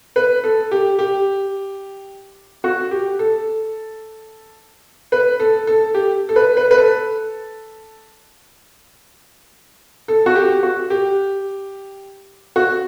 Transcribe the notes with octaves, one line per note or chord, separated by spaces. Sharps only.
B4
A4
G4
G4
F#4
G4
A4
B4
A4
A4
G4
A4
B4
B4
B4
A4
A4
F#4
G4
F#4
G4
F#4